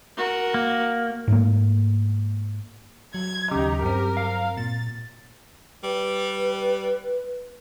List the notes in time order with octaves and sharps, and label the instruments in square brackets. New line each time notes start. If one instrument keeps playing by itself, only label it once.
[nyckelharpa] F#4 A#4
[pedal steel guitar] A#3
[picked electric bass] G#2 F#3 A3 A#3
[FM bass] F#3 [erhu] G#6
[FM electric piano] D#2 C#3 [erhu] D#4 [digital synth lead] G4
[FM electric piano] G2 C4 [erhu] A#4
[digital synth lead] F5
[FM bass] A#2 [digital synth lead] A6
[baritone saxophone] G3 [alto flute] B4